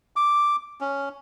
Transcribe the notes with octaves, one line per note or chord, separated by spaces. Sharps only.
D6
C#4